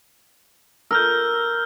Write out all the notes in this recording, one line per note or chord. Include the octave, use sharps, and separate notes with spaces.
A#4 E6 F6 G6